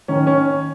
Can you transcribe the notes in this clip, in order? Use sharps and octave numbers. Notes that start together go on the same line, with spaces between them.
D#3 C#4
C#4